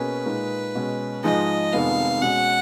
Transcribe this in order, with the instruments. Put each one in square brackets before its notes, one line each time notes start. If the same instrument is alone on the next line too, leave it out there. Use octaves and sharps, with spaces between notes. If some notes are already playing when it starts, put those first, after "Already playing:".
Already playing: [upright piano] B2 A#3 C#4 G#4 [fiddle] B4
[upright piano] A#2 G#3 D#4
B2 G#3 C#4
[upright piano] G#2 F3 G#3 D#4 G#4 [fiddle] D#5
[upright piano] F1 F2 D#3 G#3 B3 [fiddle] F5
[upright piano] B2 G#3 C#4 F#4 [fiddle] F#5